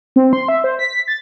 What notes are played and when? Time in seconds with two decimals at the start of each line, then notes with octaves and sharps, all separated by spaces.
0.16 C4
0.33 C6
0.48 E5
0.64 C5
0.79 B6
1.07 A6